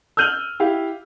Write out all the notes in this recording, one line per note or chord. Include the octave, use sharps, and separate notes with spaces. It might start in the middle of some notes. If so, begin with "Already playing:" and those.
E6 F6 G6 D#7 F7 F#7
E4 G4 F5